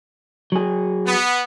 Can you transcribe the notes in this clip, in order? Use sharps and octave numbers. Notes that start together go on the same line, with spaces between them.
F#3 G#4
B3